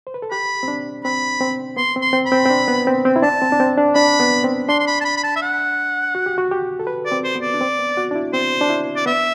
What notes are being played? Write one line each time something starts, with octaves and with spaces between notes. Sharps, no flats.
C5
B4
A4
G4 B5
C4
D4
C4 B5
C4
B3 C6
C4
C6
C4
B5
C4
C4
D4
B3
C4
C4
E4
D4 A5
C4
D4
C4
D4
D4 B5
B3
C4
D4 C6
C6
B5
A5
B5
B5
A5
E5
F#5
F#4
G4
F#4
G4
A4
B4
D5
C4
C5
B3
D5
D4
C4
B3
F#4
D4
E4
C4 C5
D4
E4
D5
B3 E5